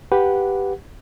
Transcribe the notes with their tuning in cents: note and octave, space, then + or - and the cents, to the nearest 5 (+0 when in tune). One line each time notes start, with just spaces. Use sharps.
G4 +0 B4 +0 F#5 -10